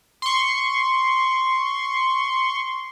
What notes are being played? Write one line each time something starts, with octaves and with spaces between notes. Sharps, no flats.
C6 C#6